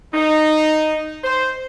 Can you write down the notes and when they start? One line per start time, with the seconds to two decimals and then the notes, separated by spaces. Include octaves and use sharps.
0.14 D#4
1.24 C5